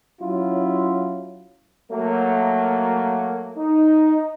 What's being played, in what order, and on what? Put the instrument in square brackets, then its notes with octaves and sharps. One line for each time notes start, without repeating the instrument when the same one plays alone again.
[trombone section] F#3 C#4 E4 F4
[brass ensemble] F#3 A3 A#3
D#4